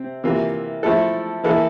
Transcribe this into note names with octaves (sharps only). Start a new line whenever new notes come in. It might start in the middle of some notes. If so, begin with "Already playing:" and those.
Already playing: C3 C4
C3 E3 A#3 F4
F3 A3 E4 A4
E3 A#3 E4 A4